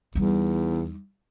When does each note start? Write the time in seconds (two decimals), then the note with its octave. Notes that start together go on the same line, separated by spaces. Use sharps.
0.15 E2 G3 D#4